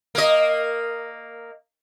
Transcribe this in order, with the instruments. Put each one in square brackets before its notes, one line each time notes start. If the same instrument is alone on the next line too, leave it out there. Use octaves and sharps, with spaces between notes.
[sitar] A#3 D#5